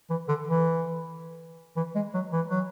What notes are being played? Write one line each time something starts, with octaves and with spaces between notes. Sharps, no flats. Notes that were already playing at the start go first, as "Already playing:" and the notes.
E3
D3
E3
E3
G#3
F#3
E3
F#3